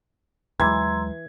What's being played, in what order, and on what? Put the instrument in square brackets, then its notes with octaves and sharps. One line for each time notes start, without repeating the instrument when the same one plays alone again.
[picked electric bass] D#2 F#3 G#3 [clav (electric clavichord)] E3 [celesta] A#5 C6 E6 [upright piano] G#6